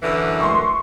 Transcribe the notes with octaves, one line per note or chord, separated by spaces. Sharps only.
F#2 D3 E3
C6 C#6